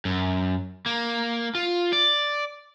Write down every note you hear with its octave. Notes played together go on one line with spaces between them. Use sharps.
F#2
A#3
F4
D5